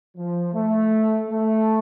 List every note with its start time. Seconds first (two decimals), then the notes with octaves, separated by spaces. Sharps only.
0.17 F3
0.54 A3
1.30 A3